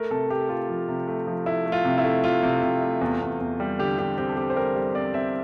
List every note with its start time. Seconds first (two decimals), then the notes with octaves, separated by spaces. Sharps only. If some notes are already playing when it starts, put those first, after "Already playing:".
Already playing: A3 A#4
0.10 C3 A4
0.30 A3 G4
0.49 A3 F4
0.69 F3
0.89 C3
1.08 A3
1.27 F3
1.46 A3 E4
1.66 A3
1.72 F4
1.85 C3
1.98 E4
2.05 A3
2.24 C3 F4
2.43 C3
2.63 C3
2.82 A3
3.01 E2
3.21 E2
3.40 E2
3.60 G3
3.79 D3 G4
3.99 D3 G4
4.18 C4 G4
4.29 A4
4.37 C4 G4
4.50 C5
4.56 G3 A#4
4.75 G3
4.95 C4 D5
5.14 C4 E5